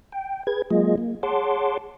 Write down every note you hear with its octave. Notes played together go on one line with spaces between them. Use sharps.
G5
G#4 B4 G#6
F#3 G#3 A#3 F4 G#4 D#5
A#3
G#4 C#5 F#5 A5 C6 D6